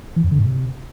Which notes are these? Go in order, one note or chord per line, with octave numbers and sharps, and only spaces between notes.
E3
F2
D3
G#2
C3